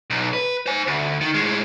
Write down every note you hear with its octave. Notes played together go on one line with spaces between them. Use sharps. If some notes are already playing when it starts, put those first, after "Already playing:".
B1
B4
C5 G#5
D2
D#3
A2 G#3